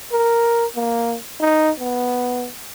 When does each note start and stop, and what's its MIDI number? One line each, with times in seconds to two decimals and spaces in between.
0.12 0.66 70
0.76 1.16 58
1.40 1.71 63
1.80 2.48 59